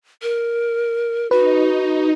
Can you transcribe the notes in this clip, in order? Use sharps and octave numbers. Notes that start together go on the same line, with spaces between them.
A#4
D#4 F#4 B4